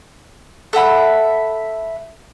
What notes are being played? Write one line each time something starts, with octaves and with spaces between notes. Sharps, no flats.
A4 E5 F#5 B5